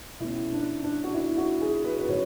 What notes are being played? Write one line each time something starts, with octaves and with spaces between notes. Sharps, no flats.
B2 A3 C#4 E4
D4
D4
F#4
E4
F#4
G#4
B4
B4
A2 F#3 C#4 C#5